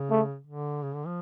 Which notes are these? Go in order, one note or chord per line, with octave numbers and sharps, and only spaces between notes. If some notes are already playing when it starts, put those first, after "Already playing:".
Already playing: C#3
A3
D3
C#3
D3
F3